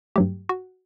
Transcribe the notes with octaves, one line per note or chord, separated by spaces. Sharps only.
G2 F#3 A3 G4
F#4